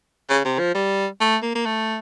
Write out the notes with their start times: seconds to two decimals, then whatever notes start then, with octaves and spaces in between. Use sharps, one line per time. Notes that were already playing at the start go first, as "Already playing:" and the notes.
0.30 C#3
0.45 C3
0.59 F3
0.75 G3
1.21 A3
1.43 A#3
1.55 A#3
1.66 A3